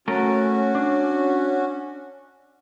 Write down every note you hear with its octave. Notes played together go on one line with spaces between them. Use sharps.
A3 C#4 F#4 A4 A#4
D4